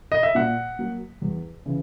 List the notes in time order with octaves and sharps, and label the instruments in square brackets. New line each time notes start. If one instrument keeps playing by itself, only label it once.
[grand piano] D#5
E5
[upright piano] A#2 [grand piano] F#5
[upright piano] F#3 A#3
E2
C#3 E3